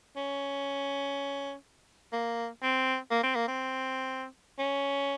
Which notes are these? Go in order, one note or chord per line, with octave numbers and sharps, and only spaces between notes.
C#4
A#3
C4
A#3
C4
A#3
C4
C#4